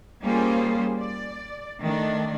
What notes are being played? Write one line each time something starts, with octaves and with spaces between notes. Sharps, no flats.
G3 A#3 C#4 F4 G#4 C5
D5
D#3 A3 D4